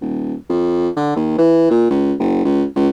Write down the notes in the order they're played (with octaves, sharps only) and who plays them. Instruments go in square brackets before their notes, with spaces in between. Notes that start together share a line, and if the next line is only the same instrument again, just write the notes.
[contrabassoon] D#1
F2
D3
D#2
E3
A#2
C#2
F#1
C#2
C#2